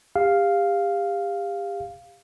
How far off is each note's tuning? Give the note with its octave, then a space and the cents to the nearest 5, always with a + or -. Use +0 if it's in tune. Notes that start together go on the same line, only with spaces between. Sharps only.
G4 +35 F5 +0